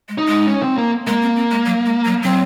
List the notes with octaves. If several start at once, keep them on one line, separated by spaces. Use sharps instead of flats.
G#3
D#4
G#3
C#4
C4
A#3
G#3 A#3
C4
C4
G#3
F#3
G#3
F#3
F#3 C4